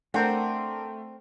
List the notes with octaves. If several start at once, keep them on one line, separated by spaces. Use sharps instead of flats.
A3 C4 D4 A#4 C5 F#5